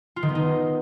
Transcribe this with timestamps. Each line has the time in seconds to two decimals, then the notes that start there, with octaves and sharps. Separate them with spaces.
0.16 F4
0.23 D#3
0.29 B3
0.35 D#4